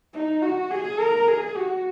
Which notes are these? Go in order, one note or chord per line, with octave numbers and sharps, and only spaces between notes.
D#4
F#4
G#4
A#4
G#4
F#4